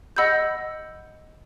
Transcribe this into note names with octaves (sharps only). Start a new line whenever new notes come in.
D#5 F#5 B5 E6 G6